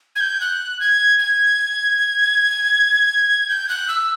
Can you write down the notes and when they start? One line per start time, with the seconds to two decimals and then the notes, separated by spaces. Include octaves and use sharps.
0.16 G#6
0.21 G6
0.41 F#6
0.80 G#6
1.19 G#6
3.49 G6
3.69 F#6
3.88 E6